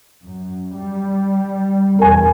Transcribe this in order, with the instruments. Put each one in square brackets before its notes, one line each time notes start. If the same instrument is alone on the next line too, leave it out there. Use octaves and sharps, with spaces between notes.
[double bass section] F#2
G3
[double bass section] E2 B2 [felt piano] A#4 G#5